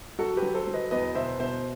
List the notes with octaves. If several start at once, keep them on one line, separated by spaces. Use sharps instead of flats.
F#3 F#4 A4
G4 B4
F#3
A4 C5
F#3
B4 D#5
E2 B4 D#5
B2 C5 E5
B2 C5 E5